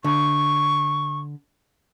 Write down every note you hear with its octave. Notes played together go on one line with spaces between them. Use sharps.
D3 C#6